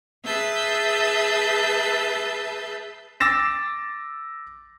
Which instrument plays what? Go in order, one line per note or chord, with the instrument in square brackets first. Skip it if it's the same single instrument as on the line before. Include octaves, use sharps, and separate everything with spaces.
[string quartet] G#4 B4 E5 A5 E6 G6
[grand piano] D6 E6 A6 A#6 E7